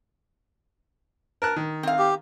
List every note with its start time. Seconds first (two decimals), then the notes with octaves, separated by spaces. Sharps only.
1.42 A#4 A5 F#6
1.56 D#3
1.83 C4 F5
1.99 G4